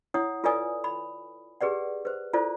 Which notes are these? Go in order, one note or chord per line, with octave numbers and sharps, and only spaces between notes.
E4 C#5 F#5 D#6
F4 A4 B4 D5 G#5 D#6
B5
G4 G#4 B4 D5 F#5
B4 C5
E4 F4 A4 C5 D5